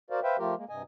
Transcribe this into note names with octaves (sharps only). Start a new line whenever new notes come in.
F#4 A#4 C5 D5 F5
B4 C5 E5 F5 G5
F3 A3 F4 G4 A#4
G#3 A#3
G2 C3 D#5 G#5